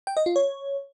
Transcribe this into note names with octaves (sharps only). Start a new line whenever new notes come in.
G5
D#5
F4
C#5